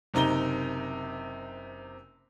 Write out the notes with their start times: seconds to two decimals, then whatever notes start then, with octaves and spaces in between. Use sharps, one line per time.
0.14 F#1 C3 D#4 A#5 G7